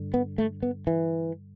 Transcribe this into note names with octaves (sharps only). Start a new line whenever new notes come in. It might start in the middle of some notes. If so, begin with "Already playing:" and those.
Already playing: G2 D3
B3
A3
B3
E3